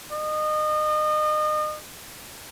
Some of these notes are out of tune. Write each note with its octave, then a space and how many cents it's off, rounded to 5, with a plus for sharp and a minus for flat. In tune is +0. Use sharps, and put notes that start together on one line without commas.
D#5 -30